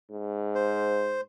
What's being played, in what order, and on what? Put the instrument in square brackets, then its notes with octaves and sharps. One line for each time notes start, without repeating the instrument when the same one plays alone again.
[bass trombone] G#2
[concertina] C5